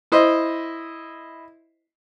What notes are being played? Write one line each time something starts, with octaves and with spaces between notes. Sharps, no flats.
E4 C5 D#5